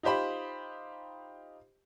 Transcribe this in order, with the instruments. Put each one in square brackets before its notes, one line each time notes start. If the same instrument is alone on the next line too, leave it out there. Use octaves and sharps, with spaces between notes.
[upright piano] D#4 F4 G4 C5 B5